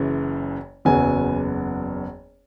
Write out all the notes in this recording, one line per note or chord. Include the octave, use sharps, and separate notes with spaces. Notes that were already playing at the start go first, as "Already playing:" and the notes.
Already playing: F#1 F#2 C#3 E3
F#1 E2 C#3 F#3 B3 G#5